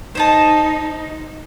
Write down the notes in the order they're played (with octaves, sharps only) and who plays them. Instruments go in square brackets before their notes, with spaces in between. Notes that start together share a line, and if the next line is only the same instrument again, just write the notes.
[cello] D#4 [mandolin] C5 D#5 A5